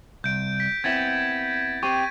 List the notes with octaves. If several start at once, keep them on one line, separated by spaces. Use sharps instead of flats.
C2 G6 D7
B6
B3 C4 E4 G#6 A6 B6
C4 G4 C#6 D#7